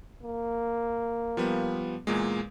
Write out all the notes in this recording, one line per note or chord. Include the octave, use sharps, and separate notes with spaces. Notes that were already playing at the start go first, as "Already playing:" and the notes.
A#3
F3 G3 B3
E2 A#2 G#3